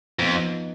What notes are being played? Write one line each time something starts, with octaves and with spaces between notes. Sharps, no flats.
F2 F3 B3 D#4